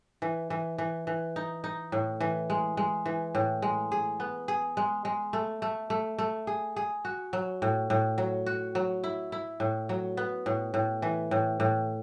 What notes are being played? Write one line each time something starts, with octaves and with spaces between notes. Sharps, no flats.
E3
E3
E3
E3
D#4
D#4
A2
E3
G#3
G#3
E3
A2
G#3
G#4
B3
G#4
G#3
G#3
A3
A3
A3
A3
G#4
G#4
F#4
F#3
A2
A2
F#3
F#4
F#3
E4
E4
A2
F#3
B3
A2
A2
E3
A2
A2